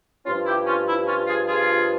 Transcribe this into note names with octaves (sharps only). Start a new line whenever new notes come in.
G2 F3 C#4 F4
E4 G4
C#4 F4
E4
C#4 F4
F4 G#4
F4 G#4